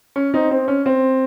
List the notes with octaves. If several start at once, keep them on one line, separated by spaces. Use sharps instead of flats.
C#4
C4 D#4
C4
C#4
C4